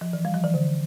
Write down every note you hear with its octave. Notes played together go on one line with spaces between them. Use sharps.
F3
E3
G3
F3
E3
D3